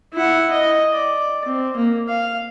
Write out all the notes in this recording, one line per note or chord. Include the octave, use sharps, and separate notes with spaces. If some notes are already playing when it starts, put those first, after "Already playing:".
E4 F#5
D#5
D5
C4
A#3
F5